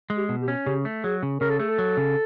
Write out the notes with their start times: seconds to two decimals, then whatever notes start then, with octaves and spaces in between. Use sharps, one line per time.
0.10 G#3
0.17 G4
0.29 B2
0.42 G4
0.48 C#4
0.67 C#3 G4
0.85 A3
1.04 F#3 G#4
1.23 C#3
1.41 C#3 A#4
1.50 A4
1.59 A3 G#4
1.68 A4
1.78 F#3
1.97 C#3